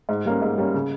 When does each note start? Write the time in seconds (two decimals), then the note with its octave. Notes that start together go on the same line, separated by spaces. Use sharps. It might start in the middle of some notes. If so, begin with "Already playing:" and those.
0.09 G#2
0.25 G3 A#3 C#4
0.42 G#2
0.58 G3 A#3 C#4
0.74 C#3